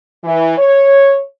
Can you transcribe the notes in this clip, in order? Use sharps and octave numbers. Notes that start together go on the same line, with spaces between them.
E3
C#5